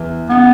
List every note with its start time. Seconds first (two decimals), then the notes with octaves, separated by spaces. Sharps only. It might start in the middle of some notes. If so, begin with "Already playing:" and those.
Already playing: E2 E3
0.29 C#3 B3